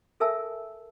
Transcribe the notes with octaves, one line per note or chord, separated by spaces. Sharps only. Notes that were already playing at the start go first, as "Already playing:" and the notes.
A4 A#4 E5 G#5 A5 E6